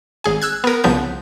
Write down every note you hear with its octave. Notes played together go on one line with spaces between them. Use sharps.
G#1 G#4 G#5
E6 F#6 G#6
B3 A#4
C2 C#3 F3 B3 G6